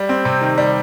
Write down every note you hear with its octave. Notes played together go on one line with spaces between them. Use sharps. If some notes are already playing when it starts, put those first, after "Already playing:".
Already playing: G3
C4
C3
D#3
G3